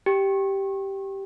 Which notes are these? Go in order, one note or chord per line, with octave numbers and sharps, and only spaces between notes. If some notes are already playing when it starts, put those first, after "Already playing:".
G4